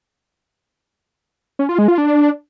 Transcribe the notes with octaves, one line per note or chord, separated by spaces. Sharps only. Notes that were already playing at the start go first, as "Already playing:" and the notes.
C#4
F4
G#3
F4
D4